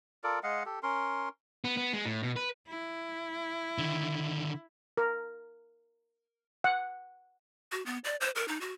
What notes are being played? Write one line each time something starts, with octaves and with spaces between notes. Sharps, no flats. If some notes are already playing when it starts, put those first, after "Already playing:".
F4 A4 A#4 D5
G#3 D#5 F5 F#5
G4 A4
C#4 A#4 C6
B3
B3
G#3
A2
B2
B4
E4
D3 D#3
A#4
F#5
F#4
B3
D5
C5
A#4
D#4
F#4